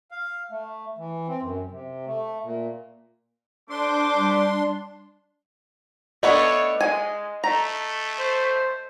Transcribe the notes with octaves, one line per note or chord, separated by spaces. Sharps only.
F5
A3
E3
C4
F#2
C3
A3
A#2
A3 D4 C5 C6 D6
G3
A3 B3 D4 C#5 D#5
G#3 G#5
A3 A#5
C5